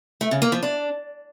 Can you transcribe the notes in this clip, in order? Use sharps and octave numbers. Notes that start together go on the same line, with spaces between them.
A3
C#3
A#3
F3
D4